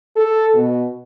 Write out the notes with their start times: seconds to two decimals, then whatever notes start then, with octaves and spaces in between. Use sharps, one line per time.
0.16 A4
0.55 B2